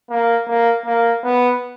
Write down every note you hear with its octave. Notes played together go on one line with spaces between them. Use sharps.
A#3
A#3
A#3
B3